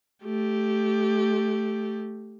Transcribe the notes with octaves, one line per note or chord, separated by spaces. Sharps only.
A3 G4